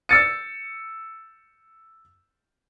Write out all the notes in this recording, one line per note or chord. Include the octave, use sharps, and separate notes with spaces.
E6 A6 C#7